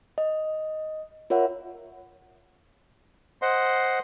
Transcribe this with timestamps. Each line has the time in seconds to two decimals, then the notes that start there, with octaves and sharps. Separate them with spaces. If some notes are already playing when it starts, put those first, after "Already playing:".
0.18 D#5
1.30 F4 A#4 C#5 E5 F#5
3.42 C5 D#5 F#5 C6